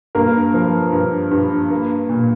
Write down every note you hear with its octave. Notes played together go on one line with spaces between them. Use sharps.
G2 A#3 A#4
F3
G2
G2
A#3
A#2